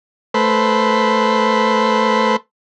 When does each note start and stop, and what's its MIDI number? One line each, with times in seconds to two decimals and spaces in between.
0.34 2.36 57
0.34 2.36 71
0.34 2.36 72